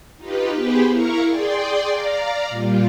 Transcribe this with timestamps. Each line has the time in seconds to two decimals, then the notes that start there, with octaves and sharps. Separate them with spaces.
0.17 D#4 F4 G4 B4
0.53 B3 G4 G#4 B4 C5 G5
0.89 E4 A#4 F5 A#5 C#6
1.26 G#4 D5 G5 C6
1.89 D5 F5 A#5
2.49 A#2 G3 F4